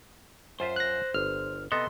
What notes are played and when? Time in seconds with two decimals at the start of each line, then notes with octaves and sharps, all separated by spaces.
0.60 F#2 F4 C5 E5
0.76 F#6 A#6
1.14 G1 F6
1.72 C3 B3 A4 D#5 C6